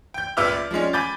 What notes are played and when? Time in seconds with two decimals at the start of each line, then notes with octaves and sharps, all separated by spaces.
0.14 G5 G6
0.37 C#2 A#2 B4 E5 D6 F6
0.52 D5
0.71 F3 G3 G#3 C#4
0.93 G#5 B5 D6 G6 A6